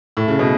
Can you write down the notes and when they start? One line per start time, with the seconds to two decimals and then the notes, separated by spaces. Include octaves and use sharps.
0.17 A2
0.28 C#3
0.39 B2